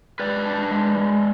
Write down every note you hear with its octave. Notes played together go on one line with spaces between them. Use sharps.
G#3 B4 D5
D4
G#3
G#3